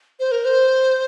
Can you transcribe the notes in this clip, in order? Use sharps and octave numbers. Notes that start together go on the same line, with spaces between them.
C5
A#4
C5